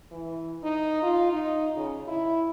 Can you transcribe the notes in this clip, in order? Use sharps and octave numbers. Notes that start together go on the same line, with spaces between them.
E3
D#4
F4
D#4
C#3
E4